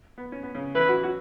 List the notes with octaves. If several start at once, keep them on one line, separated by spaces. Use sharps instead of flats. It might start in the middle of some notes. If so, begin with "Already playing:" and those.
B3
C#4
B3
C#3 C#4
E3 E4 B4
F#3 F#4
F#3 F#4